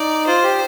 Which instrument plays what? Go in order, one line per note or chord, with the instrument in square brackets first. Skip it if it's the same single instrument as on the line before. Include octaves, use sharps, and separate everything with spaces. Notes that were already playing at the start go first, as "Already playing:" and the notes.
Already playing: [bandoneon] D#4 [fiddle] D5
[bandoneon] F4 [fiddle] C5
[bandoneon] G4